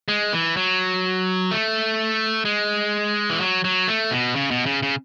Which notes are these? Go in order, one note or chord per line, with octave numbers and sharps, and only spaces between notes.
G#3
E3
F#3
A3
G#3
E3
F#3
F#3
A3
B2
C#3
B2
C#3
C#3